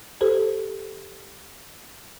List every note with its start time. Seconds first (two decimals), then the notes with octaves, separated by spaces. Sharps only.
0.21 G4 A4 C5